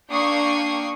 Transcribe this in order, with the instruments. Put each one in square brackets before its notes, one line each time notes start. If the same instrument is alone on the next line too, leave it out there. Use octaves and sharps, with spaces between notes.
[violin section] A#3 D4 G5 C#6 D#6 C7